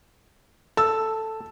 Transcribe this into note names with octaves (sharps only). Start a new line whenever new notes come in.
A4 E6